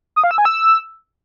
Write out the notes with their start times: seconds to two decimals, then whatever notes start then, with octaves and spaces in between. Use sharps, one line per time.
0.16 D#6
0.24 F5
0.31 E6
0.38 G#5
0.45 E6